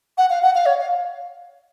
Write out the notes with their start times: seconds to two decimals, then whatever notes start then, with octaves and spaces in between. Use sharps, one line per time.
0.18 F#5
0.30 F5
0.42 F#5
0.55 F5
0.66 C#5
0.78 F5